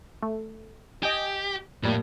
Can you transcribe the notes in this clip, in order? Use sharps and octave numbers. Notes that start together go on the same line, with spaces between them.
A3
G4 D#5 G5 G#5
F2 A2 G3 A#3